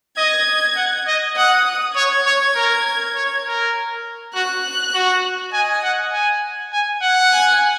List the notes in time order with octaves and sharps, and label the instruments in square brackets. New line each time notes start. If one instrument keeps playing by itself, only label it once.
[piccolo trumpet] D#5 [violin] G#6
[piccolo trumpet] F#5
D#5
[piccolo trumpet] F#5 [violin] D#6
[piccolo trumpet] C#5 [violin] G#6
[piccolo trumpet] C#5
A#4
C#5
A#4
[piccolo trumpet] F#4 [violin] F#6
[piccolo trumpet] F#4
[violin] D#5 [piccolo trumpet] G#5
[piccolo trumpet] F#5
G#5
G#5
F#5
[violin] G#5